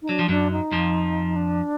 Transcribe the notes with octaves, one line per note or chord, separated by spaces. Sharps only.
D#4
F#3 D4
F3
F#2 F#3 D4
D#4
F2 F3
D4